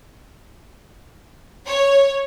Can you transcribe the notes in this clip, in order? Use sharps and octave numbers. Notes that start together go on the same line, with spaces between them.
C#5